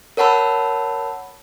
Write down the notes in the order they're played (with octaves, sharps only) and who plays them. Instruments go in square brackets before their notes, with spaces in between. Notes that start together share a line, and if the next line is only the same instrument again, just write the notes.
[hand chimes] A#4 C#5 F#5 A5 B5 E6